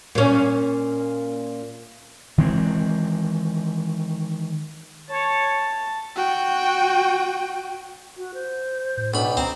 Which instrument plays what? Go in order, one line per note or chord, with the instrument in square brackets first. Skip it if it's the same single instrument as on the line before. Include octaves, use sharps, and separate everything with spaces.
[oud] A#2 C#4
[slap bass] D#3 E3 G#3 C4
[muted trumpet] C#5 [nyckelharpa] A5
[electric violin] F#4 G5
[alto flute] F#4
C5
[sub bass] A2
[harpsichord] B1 B5 [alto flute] D4
[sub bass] D2 [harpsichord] C4 [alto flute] A#5